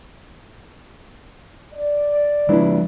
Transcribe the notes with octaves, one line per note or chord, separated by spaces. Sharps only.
D5
F3 G#3 D4 E4 B4